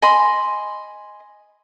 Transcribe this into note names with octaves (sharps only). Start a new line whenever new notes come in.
D#5 G#5 B5 C6